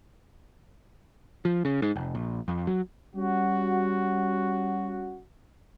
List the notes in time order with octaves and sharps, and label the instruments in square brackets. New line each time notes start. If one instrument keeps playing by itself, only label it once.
[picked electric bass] F3
C#3
G#2
F1
A#1
F2
F#3
[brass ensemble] G3 C#4 F#4